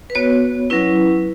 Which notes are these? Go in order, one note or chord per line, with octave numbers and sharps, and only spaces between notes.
B4
B3 F#4 C#5
F#3 C#4 E4 B4